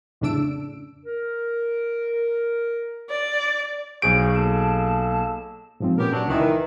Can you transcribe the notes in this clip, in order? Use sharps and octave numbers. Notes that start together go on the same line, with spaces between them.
F2 A2 C#3 D4 E6 D7
A#4
D5
B1 F#4 G#4 C5 D7
A#3 A4 A5
G#2 F3 C4
A#2 B3 C#4 G4 A#4
F#3 D4
C#2 D#3 E3 F#6
B4